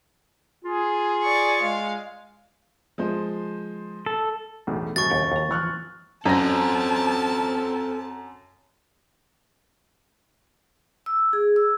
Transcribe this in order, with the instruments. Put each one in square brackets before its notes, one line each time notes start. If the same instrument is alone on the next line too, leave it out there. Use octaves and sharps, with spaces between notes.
[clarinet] F4 [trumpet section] G#4
[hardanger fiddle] D5 C#6
[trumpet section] G#3 [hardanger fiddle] F5
[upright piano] F3 G#3 C5
[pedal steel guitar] A4
[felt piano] B1 E2 A2
[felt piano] D#1 F#2 [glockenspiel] C#6 A6
[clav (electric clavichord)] D#2 G4 F#5
D#2 A#5
[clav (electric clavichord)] E3 F3 [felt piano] C#6 F6 F#6
[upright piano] F#2 A#6 [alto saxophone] C4 [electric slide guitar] A4 C5 [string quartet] A5
[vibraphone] E6
G#4
E6